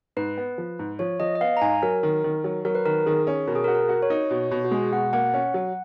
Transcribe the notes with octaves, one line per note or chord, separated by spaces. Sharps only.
G#2 B4
B3
F3
G#2
F3 C#5
F3 D#5
D#5
B3 F5
A#5
G#2 G#5
F#3 A#4
D#3
D#3
F#3
F#3 A#4
B4
D#3 A#4
D#3 G#4
C#4
B2 A#4
G#4
A#4
F#4
A#4
F#4
C#5
D#4
B2 C#5
B2
F#4
G#3 G#4
B2 F#5
A#3 F#5
C#4
F#3